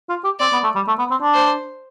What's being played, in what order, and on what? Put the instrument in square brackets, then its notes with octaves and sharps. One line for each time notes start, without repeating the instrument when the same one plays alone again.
[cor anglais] F4
G4
[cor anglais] C4 [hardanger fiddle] D5
[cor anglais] B3
A3
G3
A3
B3
C4
D4
[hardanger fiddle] C5